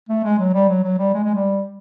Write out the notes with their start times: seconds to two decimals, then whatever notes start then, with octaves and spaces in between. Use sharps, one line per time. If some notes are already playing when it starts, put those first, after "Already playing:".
0.09 A3
0.24 G#3
0.39 F#3
0.54 G3
0.69 F#3
0.84 F#3
0.98 G3
1.14 G#3
1.24 G#3
1.34 G3